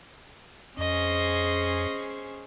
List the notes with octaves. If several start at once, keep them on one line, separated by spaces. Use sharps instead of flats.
F2 C#4 G#4 C5 D#5